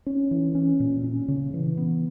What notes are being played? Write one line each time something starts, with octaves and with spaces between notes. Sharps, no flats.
C#4
E3
C#4
A#2
C#4
C#3
E3
B3